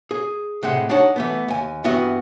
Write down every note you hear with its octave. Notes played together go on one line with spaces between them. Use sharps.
G#4
A2 C3 G#3 F#5
D4 D#4 C#5 F#5 A5
E3 A3 B3
D#2 G#5
G2 E3 B3 E4 F#4 E5